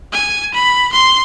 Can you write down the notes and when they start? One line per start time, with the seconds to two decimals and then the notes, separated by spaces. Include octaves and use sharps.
0.13 G#5
0.54 B5
0.93 C6